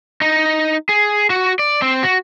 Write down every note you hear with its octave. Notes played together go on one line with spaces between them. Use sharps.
D#4
G#4
F#4
D5
C4
F#4